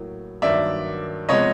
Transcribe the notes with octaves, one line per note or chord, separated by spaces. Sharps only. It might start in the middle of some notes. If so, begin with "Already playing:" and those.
Already playing: A2 F#3 A#3
G2 D#3 F#3 A#3 D5 E5
C3 F3 G#3 B3 C#5 D#5